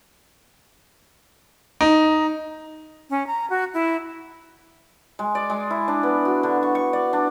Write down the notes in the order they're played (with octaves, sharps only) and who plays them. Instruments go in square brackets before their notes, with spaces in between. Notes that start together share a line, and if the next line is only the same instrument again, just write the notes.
[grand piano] D#4
[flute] C#4
A#5
F#4
E4
[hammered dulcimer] G#3
D5
G#3
E4
D4
B3
F#4
D3
C#6
C#6
D5
D4